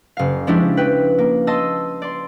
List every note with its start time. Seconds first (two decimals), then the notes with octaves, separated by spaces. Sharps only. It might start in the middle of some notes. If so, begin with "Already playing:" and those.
0.17 F#1 F5
0.47 F3 G#3 C#4 D4 E4 G4
0.77 B4 G5
1.18 A#3
1.47 D#5 A5 C6 E6
2.02 D5 C6